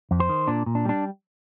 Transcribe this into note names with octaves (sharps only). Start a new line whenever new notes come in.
F2
C5
D#3
A#2 D4
A#2
D4
G3 D4